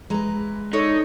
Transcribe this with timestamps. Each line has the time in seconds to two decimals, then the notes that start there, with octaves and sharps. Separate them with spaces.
0.10 E3 G#3 B4 A#5
0.73 D4 D#4 A4 C#5